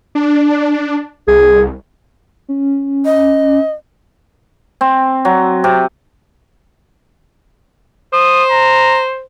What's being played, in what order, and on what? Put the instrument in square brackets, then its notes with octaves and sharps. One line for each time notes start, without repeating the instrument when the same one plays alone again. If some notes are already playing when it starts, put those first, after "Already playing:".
[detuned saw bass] D4
[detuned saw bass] C2 [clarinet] G#4
[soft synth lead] C#4
[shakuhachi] D#5
[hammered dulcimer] C4
F#3
C3
[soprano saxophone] C5 [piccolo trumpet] D#6
[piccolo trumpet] A#5